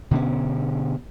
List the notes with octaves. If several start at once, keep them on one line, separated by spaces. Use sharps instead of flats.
B2 D3 B3 C#4